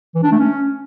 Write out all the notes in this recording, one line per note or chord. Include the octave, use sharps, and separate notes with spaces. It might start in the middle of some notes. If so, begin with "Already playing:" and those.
E3
D4
A3
C#4